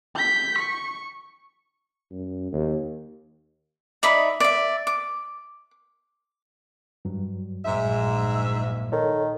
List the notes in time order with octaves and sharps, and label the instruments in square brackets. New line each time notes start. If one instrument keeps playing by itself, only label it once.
[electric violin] G6 B6
C#6
[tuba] F#2
D#2
[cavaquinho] D#4 D5 E5 B5
D5 E5
D6
[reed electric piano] G2 F#3
[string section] A#1 [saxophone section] G#2 E5
[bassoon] D#3 [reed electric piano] A4 C#5